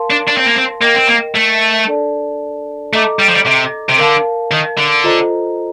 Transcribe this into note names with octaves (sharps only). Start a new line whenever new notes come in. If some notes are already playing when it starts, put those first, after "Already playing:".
Already playing: A#4 F5 A5 C6
D4
D4
C4
A#3
C4
A#3 A#4 D#5 G5
C4
A#3
A3
D4 A4 D5 A5
A3 A4 D#5 A#5 D6
G3
F3
G3
C3
C3
D3 A#4 F5 A5
D#3
D3
F4 A4 C5 D#5 A#5